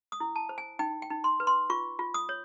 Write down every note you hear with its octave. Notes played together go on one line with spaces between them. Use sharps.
D#6
E4
A5
C5
G#5
D#4 G5
G5
D#4
C6
B4
C6
F4 C#6
F4
D#6
C#5